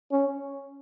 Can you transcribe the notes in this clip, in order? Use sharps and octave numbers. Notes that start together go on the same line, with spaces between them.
C#4